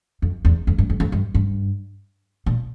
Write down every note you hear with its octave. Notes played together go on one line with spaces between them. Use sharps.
F2
E2
F2
G2
F2
F2
G2
G2
A#2